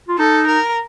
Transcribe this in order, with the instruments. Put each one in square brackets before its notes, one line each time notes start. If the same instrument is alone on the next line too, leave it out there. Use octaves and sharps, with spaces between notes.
[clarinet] F4
[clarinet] D#4 [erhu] A4
[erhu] A#4